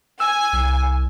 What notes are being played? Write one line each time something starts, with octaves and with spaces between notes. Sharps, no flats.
G#5 E6
C2